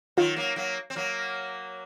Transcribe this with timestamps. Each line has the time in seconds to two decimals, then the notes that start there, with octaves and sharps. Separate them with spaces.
0.17 D#3 F#3 F4
0.36 F#3 A#3
0.56 F#3 A#3
0.90 C4
0.96 F#3 A#3